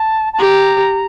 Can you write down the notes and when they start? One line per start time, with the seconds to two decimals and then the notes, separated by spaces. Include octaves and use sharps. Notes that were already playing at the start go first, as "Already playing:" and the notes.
Already playing: A5
0.33 A5
0.39 G4 A#5